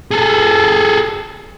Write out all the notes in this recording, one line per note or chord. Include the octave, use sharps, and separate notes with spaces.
G#4 A4